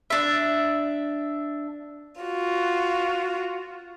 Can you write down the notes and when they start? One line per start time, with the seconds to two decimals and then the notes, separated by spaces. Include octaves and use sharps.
0.10 D4 E5
2.22 F4 F#4